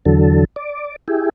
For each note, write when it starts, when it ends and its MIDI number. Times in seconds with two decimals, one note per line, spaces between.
0.05 0.45 40
0.05 0.45 50
0.05 0.45 54
0.05 0.45 69
0.56 0.96 74
1.08 1.29 64
1.08 1.29 67
1.08 1.29 68